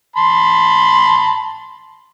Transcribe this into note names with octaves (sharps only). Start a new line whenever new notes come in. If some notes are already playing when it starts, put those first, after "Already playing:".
A5 B5 C6